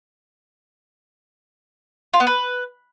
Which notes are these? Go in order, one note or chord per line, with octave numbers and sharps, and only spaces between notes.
F4
B3
B4